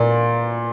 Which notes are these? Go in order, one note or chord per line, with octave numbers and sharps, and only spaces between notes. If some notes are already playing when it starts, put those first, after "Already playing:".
Already playing: A#2 D5